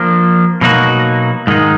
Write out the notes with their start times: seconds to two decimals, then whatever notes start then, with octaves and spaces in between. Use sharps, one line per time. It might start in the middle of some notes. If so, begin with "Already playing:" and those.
Already playing: F3 A#3 D4
0.61 B2 F#3 A#3 D#4 F#4
1.47 G#2 D#3 G#3 D#4